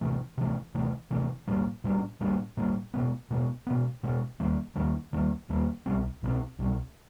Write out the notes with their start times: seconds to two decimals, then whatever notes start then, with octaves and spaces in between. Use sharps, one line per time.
0.01 C3 E3 A3
0.38 C3 E3 A3
0.75 C3 E3 A3
1.11 C3 E3 A3
1.47 A#2 G3 A#3 D4
1.84 A#2 G3 A#3 D4
2.21 A#2 G3 A#3 D4
2.57 A#2 G3 A#3 D4
2.94 B2 G#3 B3
3.30 B2 G#3 B3
3.67 B2 G#3 B3
4.03 B2 G#3 B3
4.40 D#2 D#3 G3 A#3
4.76 D#2 D#3 G3 A#3
5.13 D#2 D#3 G3 A#3
5.49 D#2 D#3 G3 A#3
5.86 C2 B2 G3 C4
6.23 C2 B2 G3 C4
6.59 C2 B2 G3 C4